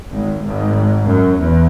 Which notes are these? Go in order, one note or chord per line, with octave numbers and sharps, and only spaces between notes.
G#1 G#2
G#1 G#2
F#2
E2